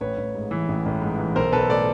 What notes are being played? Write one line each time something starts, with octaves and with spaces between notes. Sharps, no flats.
A1 B4 C#5
A1
G#2
E3
A1
A1
G#2
E3
B1 A#4 C5
B1 A4 B4
A2 C5 D5